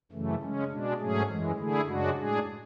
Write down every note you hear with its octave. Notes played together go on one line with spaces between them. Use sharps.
F#2 C#3 E3 A3
C#3 G#3 C#4
B2 G#3 D4
G#2 F#3 A3 C#4 G#4
F#2 E3 G#3
D3 A3 E4 G#4
F#2 C#3 G#3 D4 F#4
A2 G#3 D4 G#4